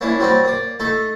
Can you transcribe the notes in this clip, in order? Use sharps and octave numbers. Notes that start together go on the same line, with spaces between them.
A#3 C#4 D4 E4
F#3 G3 C4 F#4 D5 D#5
A#3 D5
A3 D#4 A4